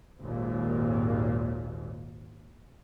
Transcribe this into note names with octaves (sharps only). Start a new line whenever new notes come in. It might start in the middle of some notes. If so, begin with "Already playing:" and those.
G#1 D#2 A#2